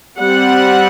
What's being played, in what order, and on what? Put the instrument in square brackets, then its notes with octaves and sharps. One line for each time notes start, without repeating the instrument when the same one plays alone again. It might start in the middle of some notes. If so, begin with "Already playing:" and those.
[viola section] G3 C4 F#5